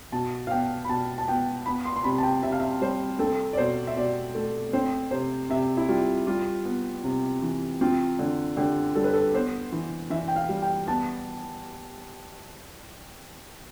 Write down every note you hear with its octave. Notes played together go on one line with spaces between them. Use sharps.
B2 A5
F5
B3 G5
B5
B2 A5
A5
B3 G5
B3 B5
C6
C6
C3 B5
A5
G5
C3 E5
F5
E5
G3 C5
C4 A4
D5
B2 C5
E5
B2 D5
A3
C4 C5
C3 C5
C3 E5
E4
G3 F4
G3 F4
B3
C3
E3
C4 F4
D3
D3 G4
G3 A4
B4
A4
B3 C5
E3
E3 E5
G5
F5
G3
G5
B3 A5